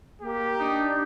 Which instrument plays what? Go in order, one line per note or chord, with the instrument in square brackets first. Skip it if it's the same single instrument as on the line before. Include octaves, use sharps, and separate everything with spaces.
[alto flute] A#3 [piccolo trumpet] G4
[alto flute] D4 [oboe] D#4